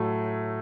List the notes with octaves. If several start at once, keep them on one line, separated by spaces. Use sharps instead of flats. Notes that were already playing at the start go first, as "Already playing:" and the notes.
Already playing: A2 F#3 A3